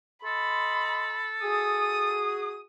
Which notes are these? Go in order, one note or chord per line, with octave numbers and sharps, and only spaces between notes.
A4 D#5 B5 C6
F#4 G#4 D#6